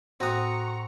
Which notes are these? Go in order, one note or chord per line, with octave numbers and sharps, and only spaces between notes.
A2 C4 F#4 F#5 A#5 C#6 D#6